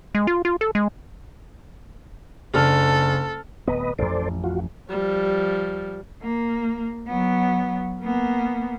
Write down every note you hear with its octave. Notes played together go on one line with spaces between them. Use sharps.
G#3
F4
F4
A4
G#3
F#1 D4 A4 F6
D1 B3 B4 D#5
A1 F2 A4 C5 D5
F4 F#4
F3 G3
A#3
F#3 B3
A#3 B3